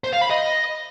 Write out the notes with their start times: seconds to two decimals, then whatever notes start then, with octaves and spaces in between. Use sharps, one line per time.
0.04 C5
0.13 F5
0.22 B5
0.30 D#5